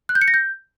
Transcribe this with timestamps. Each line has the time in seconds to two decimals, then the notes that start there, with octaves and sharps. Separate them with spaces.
0.09 F#6
0.15 G6
0.22 C#7
0.28 A#6
0.34 G6